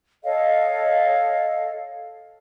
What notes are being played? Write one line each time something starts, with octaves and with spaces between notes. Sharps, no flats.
A4 C#5 D#5 F5